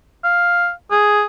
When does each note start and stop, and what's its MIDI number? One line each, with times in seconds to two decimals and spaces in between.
0.24 0.71 77
0.91 1.25 68